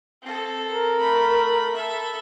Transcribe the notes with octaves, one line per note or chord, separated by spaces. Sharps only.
C4 A4
A#4
A3 B5
A4 E5